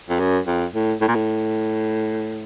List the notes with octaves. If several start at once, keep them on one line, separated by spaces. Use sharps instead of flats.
F2
F#2
F2
A2
A2
A#2
A2